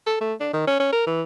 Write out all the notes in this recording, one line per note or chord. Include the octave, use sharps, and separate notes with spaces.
A4
A3
D4
D#3
C#4
C#4
A#4
E3